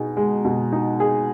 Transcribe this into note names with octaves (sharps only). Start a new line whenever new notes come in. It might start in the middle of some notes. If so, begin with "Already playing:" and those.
Already playing: B2 D#4 G#4
G#3
B2
D#4
G#4